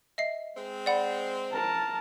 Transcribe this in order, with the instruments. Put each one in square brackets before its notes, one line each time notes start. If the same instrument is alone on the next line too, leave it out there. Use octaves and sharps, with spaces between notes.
[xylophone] D#5 E5 C7
[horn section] G#3 C4
[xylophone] D5 F#5 B5
[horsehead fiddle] A#4 A5